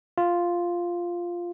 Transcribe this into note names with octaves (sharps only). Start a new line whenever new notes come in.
F4